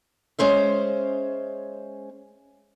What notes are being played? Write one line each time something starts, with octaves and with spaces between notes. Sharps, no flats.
G#3 C#4 C5 E5